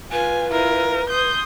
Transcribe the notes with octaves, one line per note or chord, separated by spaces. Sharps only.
F4 B4 G#5
E4 F4 A#4
C6 D#6 G6